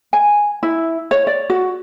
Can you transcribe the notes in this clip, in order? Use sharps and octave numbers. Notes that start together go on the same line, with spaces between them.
G#5
E4
C#5
D5
F#4